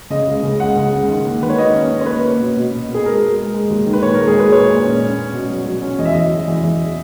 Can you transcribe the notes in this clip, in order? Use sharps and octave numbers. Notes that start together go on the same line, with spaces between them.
C#3 D#5
C#2
C#3
C#2 F#5
C#3
G#3
D#3
A#3
D#3 B4
C#5
A#3 D#5
C#4
C#4
C#5
A#3 B4
A#3
B2
B2
B2
B2
G#4
G#3 A#4
G#3
G#3
G#3
D#2
D#3
B4
A#2 C#5
A#4
G#3
G#4
A#2 B4
G#3 C#5
A#2
C#4
C#4
C#4
B2
F#3
F#3
C#4
E2 D#5
E5
E2 D#5
F#3
E2
E2